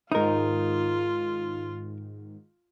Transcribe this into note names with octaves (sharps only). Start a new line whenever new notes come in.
G#2 D#3 D#4 F4 A#4